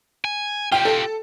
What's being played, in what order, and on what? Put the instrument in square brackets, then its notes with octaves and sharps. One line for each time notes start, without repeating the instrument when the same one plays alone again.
[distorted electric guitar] G#5
[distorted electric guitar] F4 G4 [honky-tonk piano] G5
[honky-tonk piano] A4